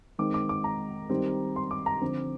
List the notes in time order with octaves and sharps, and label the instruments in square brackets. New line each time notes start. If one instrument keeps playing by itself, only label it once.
[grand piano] D#3 G#3 C4 D6
D6
D6
A#5
D#3 G3 C4
C6
D6
A#5
D3 F3 C4